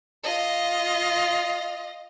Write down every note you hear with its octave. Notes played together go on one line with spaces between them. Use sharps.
F4 D#5